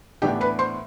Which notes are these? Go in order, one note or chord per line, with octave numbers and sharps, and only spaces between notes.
A2 E3 B3 D4 G4 G5
B4 B5
C5 C6